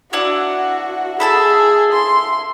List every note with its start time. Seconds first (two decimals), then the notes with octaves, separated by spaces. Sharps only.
0.13 D4 E4 F#4 F#5
1.20 E4 G#4 A4 A5
1.93 C6